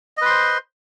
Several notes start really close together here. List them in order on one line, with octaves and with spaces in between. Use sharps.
D#5 B4 C6 C5